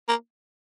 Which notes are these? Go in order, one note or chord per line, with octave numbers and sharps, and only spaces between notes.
A#3